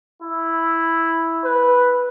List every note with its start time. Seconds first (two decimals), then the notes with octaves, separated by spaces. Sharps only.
0.23 E4
1.44 B4